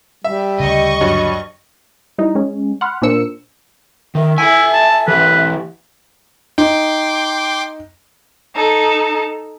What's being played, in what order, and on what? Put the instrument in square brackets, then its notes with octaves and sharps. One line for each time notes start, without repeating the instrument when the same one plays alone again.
[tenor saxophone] G3 [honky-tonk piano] E5
[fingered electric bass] D2 C#3 [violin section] D#5 C#6
[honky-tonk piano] G2 F#3
[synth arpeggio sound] G3 D#4 E4
G#3 C#4
F#5 B5 C6 F6
A#2 A#3 D4 C5 E6 C#7
[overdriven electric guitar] D#3 [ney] E5
[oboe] E4 [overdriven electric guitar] A4 G#5
[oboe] A5
[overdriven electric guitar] E3 G4 [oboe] B4
[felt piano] D#4 [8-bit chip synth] G5 C6 D6
[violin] D#4 A4